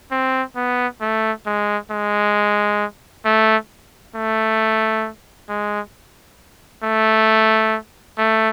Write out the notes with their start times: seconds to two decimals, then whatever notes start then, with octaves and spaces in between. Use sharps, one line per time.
0.11 C4
0.56 B3
1.01 A3
1.46 G#3
1.91 G#3
3.25 A3
4.15 A3
5.49 G#3
6.83 A3
8.18 A3